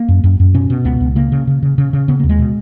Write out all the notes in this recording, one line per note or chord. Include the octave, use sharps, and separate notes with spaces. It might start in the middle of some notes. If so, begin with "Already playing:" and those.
Already playing: A#3
F#2
F#2
F#2
B2 C#4
B2
C#2 B3
C#2
C#3 A#3
C#3
C#3
C#3
C#3
C#3
C#3 B3
A#3
D#2
G#3
B2